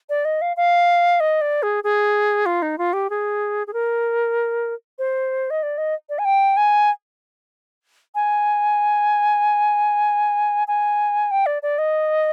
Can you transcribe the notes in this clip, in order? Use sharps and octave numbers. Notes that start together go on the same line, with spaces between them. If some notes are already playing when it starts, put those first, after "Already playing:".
D5
D#5
F5
F5
D#5
D5
G#4
G#4
F4
D#4
F4
G4
G#4
G#4
A#4
C5
D#5
D5
D#5
D5
G#5
G5
G#5
G#5
G#5
G5
D5
D5
D#5